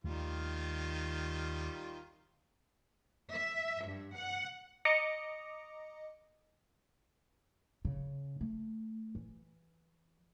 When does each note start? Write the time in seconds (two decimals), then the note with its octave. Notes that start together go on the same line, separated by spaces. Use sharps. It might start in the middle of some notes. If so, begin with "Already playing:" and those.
0.04 D#2 D#3 G3 A3 F4
3.32 E5
3.87 G2
4.16 F#5
4.85 D#5 A#5 D6 C#7
7.85 C#3
8.41 A3
9.15 E3